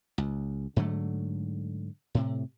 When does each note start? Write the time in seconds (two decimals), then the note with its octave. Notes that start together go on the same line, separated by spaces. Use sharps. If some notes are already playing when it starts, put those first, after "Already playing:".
0.18 C#2
0.76 G#2 D3 F#3 A3
2.15 A2 C3